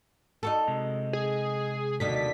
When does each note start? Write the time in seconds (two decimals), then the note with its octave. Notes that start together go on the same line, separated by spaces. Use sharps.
0.43 D#4 F#4 A4
0.68 C3 G#3
1.13 G#4
2.00 D#2 B2 D3 B6